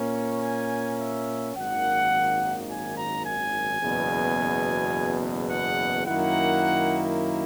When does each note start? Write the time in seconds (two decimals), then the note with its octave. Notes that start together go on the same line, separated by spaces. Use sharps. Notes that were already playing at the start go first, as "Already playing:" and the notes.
Already playing: A#2 A#3 C#4
0.14 C#5
0.41 G#5
0.99 E5
1.55 G#1 F#2 D#3 A#3 F#5
2.68 G#5
2.96 A#5
3.24 G#5
3.80 F#1 E2 B2
5.49 F#5
6.06 F#2 D#3 A#3 E4 F#5